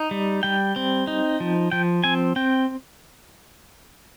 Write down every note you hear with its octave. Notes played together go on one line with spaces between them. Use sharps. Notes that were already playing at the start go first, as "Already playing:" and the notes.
Already playing: D#4
G3
G3 G5
C4
D#4
F3
F3 G5
C4 G#5
C4 G5